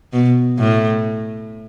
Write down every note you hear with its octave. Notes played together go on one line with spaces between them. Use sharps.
B2
A2